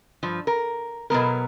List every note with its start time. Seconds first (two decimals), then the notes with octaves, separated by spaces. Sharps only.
0.23 G2 F3
0.47 A#4
1.10 B2 F#3 B3 A#4